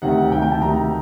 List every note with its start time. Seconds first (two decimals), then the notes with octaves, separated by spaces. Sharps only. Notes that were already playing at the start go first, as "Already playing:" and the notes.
0.02 D2 C3 D#3 F#5
0.32 D2 C3 D#3 G5
0.42 G5
0.51 A5
0.62 D2 C3 D#3 A#5